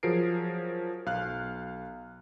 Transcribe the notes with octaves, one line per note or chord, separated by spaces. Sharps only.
F3 F#3 G#4 A#4 C7 D7
B1 F5 F6 F#6